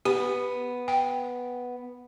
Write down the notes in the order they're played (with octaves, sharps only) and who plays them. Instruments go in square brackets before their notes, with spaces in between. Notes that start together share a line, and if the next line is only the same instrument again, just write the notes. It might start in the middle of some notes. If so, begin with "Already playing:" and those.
[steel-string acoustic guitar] B3 [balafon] G4
[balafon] G5